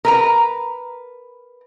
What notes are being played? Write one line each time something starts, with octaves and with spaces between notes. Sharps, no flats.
A#4 B4 A#5